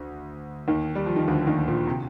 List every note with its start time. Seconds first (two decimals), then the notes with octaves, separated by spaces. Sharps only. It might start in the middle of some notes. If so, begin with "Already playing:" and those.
Already playing: D2 D3
0.68 D#2 D#3
0.95 G3
1.06 F3
1.16 D#3
1.27 D2 D3
1.47 D#2 D#3
1.68 A#2
1.87 C3